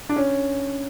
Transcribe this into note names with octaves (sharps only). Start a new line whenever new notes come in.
D4
C#4